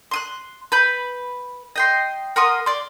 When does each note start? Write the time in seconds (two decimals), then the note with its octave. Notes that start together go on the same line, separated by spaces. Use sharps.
0.11 C6 D#6 F#6
0.72 B4 B5 G6
1.76 D#5 G5 C6
2.36 A#4 F#5 C6 D#6
2.66 D5 C6